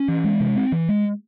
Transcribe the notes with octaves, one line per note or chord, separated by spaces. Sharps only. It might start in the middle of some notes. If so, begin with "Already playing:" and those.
Already playing: C#4
E3
G#3
C3
C4
E3
G#3